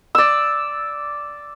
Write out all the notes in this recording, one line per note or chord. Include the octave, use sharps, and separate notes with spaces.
D5 E6